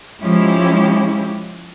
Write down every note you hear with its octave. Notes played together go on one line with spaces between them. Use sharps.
F3 G#3 C#4 E4 G4